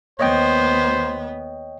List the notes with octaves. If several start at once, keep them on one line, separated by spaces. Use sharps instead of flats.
D#2 B3 C5 C#5 D#5 G5